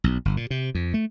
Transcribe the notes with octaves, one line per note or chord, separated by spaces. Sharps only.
B1
G1
A#2
C3
F2
A3